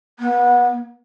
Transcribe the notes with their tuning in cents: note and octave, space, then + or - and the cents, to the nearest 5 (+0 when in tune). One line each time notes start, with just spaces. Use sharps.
B3 -30